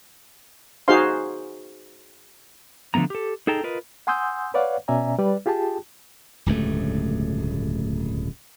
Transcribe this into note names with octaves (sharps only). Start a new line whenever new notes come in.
D#4 F#4 G#4 C5 F5 C6
D3 F3 A3 B3 A#5
G4 A4
D#4 G#4 A4 G5 A#5
F4 A#4 B4 D#5
F#5 G#5 C6 D#6 E6 G6
B4 C#5 D5 F5 F#5
B2 C#4 D5 E5 G#5 A#5
G3 B4 D5
F4 G4 G#4 G5 A5
D1 C#2 G2 A3